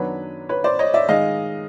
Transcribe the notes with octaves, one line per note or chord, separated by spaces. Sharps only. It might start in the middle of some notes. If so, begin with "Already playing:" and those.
Already playing: F#2 D#3 F#3 B3 D4 B4 C#5
B4 C#5
C5 D5
C#5 D#5
D5 E5
D#3 G#3 D#5 F5